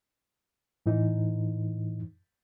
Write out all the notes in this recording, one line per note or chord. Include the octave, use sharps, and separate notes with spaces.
A2 E3 D#4